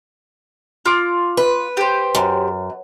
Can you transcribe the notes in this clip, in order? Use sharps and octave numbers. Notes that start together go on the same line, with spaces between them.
F4 D6
B4
G4 C5
F#2